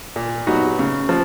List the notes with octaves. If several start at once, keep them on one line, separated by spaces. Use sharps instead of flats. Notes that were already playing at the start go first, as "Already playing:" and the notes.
A#2
F#3 B3 D#4 F#4
C#3
F3